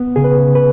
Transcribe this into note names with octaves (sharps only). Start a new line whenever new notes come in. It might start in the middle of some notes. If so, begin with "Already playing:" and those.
Already playing: B3
C#3 G#4
B4
C#3
B4